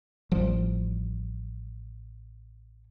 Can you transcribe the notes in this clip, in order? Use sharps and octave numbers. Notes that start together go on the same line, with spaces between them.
A1 F3 G3